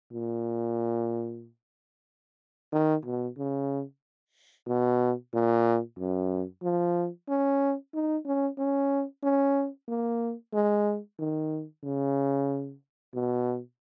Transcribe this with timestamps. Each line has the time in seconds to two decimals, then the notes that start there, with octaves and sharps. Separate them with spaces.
0.12 A#2
2.72 D#3
3.05 B2
3.37 C#3
4.67 B2
5.33 A#2
5.98 F#2
6.63 F3
7.28 C#4
7.94 D#4
8.26 C#4
8.58 C#4
9.23 C#4
9.88 A#3
10.53 G#3
11.19 D#3
11.83 C#3
13.14 B2